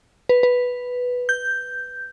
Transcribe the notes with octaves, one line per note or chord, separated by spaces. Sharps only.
B4
B4
G6